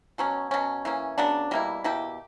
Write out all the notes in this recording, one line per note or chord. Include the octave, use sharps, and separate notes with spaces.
B2 F#3 C#4
B2 F#3 C#4
E3 A#3 C#4
C#3 F#3 B3 D4
B2 G3 A#3 E4
B2 A#3 E4 G4